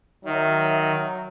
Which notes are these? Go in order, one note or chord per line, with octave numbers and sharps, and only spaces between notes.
D#3 F#3 E5